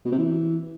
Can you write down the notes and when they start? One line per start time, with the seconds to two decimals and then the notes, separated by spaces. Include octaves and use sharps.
0.05 B2
0.12 C3
0.18 E3